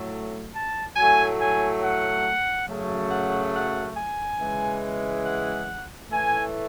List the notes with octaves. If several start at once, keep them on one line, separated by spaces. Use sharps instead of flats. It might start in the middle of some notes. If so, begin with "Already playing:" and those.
Already playing: A2 F#3 A3
A5
A2 F#3 A3 G#5
G#5
F#5
F#2 C#3 F#3 A3
F#5
F#5
G#5
C#3 E3 G#3
F#5
A2 E3 A3 G#5